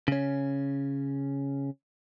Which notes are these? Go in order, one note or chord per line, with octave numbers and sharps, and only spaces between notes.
C#3 C#4